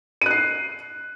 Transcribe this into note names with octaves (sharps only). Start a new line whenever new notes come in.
F#6 C7 D#7